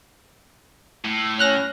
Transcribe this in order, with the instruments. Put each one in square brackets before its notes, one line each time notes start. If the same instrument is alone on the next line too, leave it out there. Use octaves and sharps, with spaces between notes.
[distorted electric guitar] A2
[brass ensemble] C#4 [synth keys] F6 F#6 A#6